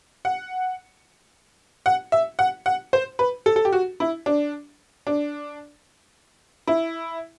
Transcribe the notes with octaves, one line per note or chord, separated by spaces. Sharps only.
F#5
F#5
E5
F#5
F#5
C5
B4
A4
A4
G4
F#4
E4
D4
D4
E4